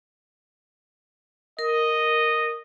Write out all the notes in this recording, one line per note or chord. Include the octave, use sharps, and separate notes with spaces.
A#4 D#5